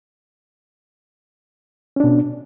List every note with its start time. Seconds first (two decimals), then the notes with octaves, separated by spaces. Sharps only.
1.96 C#4
2.00 D4
2.04 B2